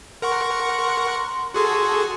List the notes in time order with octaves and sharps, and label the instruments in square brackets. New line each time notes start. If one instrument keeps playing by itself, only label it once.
[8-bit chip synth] A#4 F#5 C#6 [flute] C6
[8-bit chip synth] F#4 G#4 A4 [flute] C6